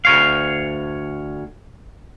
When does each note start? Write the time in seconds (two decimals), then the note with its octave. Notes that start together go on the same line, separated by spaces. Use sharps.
0.05 D2 C#5 F5